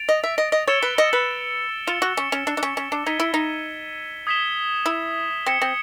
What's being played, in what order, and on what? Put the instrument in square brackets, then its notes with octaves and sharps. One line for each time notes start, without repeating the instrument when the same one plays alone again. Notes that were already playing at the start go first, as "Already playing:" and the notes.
Already playing: [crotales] A6 D7 F7
[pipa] D#5
E5
D#5
D#5
[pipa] C#5 [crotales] E6 A6 C#7 E7 G7
[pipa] B4
D#5
B4
[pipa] F4 [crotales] A6 C#7 E7 G7
[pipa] F#4
C#4
C#4
D4
D4
C#4
C#4
D4
[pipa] D#4 [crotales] G#6 B6 D#7 G7
[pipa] E4
D#4
[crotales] D#6 G#6 B6 E7 G7
[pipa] E4
[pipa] C4 [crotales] G#6 C#7 E7 G7
[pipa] C4